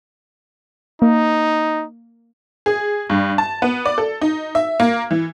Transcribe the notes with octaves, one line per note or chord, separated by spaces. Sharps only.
A#3 D#4
G#4
G2
A5
B3
D5
A4
D#4
E5
A#3
E3